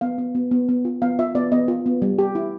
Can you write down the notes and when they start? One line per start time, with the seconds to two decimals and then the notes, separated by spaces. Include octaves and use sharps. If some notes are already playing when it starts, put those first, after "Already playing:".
0.01 B3 F5
0.18 B3
0.35 B3
0.51 B3
0.69 B3
0.85 F4
1.02 B3 F5
1.19 F4 E5
1.35 B3 D5
1.52 B3 D#5
1.68 F4
1.86 B3
2.02 G3
2.19 G4
2.35 E4